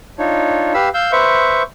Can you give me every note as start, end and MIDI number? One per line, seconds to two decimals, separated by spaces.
0.19 0.73 62
0.19 0.73 63
0.19 0.73 65
0.19 0.73 73
0.74 0.89 67
0.74 0.89 71
0.74 0.89 77
0.74 0.89 83
0.74 0.89 88
0.94 1.12 77
0.94 1.12 88
0.94 1.12 91
1.12 1.63 71
1.12 1.63 72
1.12 1.63 76
1.12 1.63 85